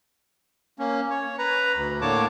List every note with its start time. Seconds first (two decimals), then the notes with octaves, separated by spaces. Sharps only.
0.79 A#3 C#4
1.10 C#5
1.39 B4 A#5
1.75 D2
2.01 A2 D3 A#3 C#5 A5 D6